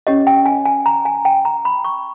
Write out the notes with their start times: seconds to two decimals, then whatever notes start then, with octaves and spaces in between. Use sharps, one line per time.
0.07 C#4 G4 C#5 D#5
0.27 G5
0.46 G#5
0.65 G#5
0.86 A#5
1.05 G#5
1.25 G5
1.45 A#5
1.65 B5
1.85 C#6